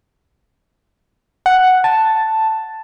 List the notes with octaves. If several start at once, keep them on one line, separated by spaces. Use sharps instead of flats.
F#5
A5